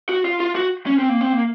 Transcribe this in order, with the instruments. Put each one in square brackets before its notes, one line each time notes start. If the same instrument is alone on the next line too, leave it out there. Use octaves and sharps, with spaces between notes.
[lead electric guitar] F#4
F4
F4
F#4
C#4
C4
A#3
C4
A#3